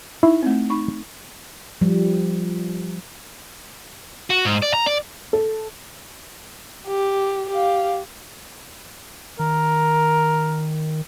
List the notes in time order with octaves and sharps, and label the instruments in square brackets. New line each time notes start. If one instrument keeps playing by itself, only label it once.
[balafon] D#4 [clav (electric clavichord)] E4
[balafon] A3 C4
D#4 B5 C#6
[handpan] F3 G3
[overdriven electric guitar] F#4
G#2
D5
A#5
D5
[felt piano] A4
[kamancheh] G4
G4 F5
[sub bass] D#3 [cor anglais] A#4